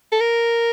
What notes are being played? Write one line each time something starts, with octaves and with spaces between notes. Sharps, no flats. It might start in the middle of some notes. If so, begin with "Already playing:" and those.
A4
A#4